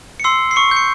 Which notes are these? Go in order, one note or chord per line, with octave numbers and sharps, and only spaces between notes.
C#7
C6 E6 C7
C7
C#6 C#7
G6
C#7